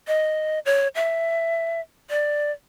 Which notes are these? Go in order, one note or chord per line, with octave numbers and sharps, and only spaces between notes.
D#5
C#5
E5
D5